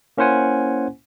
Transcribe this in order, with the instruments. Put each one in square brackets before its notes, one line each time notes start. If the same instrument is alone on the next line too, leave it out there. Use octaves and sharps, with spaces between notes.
[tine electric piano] A#3 C#4 E4 C5 F#5 G#5